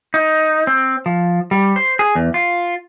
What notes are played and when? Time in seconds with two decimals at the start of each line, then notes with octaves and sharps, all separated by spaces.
0.14 D#4
0.67 C4
1.06 F3
1.51 G3
1.76 C5
1.99 G#4
2.15 E2
2.34 F4